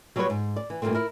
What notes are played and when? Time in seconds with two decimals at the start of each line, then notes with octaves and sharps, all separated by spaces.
0.16 F#3 G3 F#4 G#4 B4 C#5
0.30 G#2
0.56 D5
0.70 E3
0.82 G2 A#2 D3 D#3 A3 C4
0.95 E4 A#4